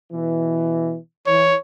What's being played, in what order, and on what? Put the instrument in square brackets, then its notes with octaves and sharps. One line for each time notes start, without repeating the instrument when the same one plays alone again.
[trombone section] B2 E3
[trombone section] E3 [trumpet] C#5